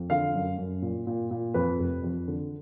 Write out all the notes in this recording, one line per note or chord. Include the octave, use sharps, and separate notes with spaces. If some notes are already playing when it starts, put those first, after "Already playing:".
Already playing: F2
D3 F5
F#2
F#2
A#2
A#2
A#2
F2 B4
F1
F2
D3